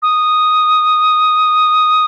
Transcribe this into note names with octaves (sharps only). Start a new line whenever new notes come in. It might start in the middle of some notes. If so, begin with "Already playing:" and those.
D#6